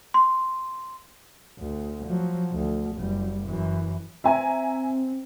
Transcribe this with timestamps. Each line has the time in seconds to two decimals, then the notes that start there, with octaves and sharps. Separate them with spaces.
0.14 C6
1.59 D2
2.07 F3 F#3
2.52 D2
2.97 F#1 G3
3.47 F#2 E3
4.24 C4 E5 G#5 A#5